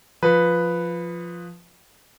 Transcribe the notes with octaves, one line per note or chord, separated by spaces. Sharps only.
F3 B4